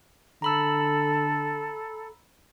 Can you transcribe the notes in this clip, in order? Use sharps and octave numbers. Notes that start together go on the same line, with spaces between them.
D3 A4 A#5 B5 E6